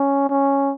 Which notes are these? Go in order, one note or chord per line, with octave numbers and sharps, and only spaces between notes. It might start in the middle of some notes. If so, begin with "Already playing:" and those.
Already playing: C#4
C#4